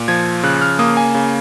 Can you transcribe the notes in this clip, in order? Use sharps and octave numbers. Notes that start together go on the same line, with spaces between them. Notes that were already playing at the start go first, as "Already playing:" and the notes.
Already playing: A#2
F3 G#6
C#3 F#6
F#6
F6
A#3 D#6
G#5
C#3